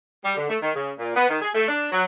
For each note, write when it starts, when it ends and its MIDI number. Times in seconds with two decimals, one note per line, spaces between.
0.25 0.36 55
0.37 0.46 50
0.49 0.57 57
0.62 0.72 51
0.75 0.91 49
0.99 1.14 46
1.15 1.27 59
1.29 1.40 51
1.42 1.50 68
1.55 1.67 57
1.68 1.88 62
1.92 2.04 54